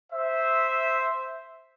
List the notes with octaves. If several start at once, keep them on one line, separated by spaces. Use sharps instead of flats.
C5 E5